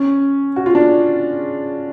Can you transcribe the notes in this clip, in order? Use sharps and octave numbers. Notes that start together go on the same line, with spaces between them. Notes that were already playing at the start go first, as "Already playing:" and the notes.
Already playing: C#4
F#4
F4
D4